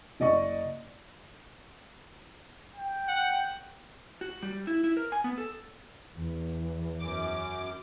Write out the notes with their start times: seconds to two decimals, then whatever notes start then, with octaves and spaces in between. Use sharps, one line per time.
0.20 F#1 D5 D#5 C#6
2.76 G5
3.08 F#5
4.21 F#4
4.43 G3
4.67 E4
4.84 E4
4.97 A#4
5.12 G#5
5.24 B3
5.38 A4
6.16 E2 E3
7.00 F#2 D6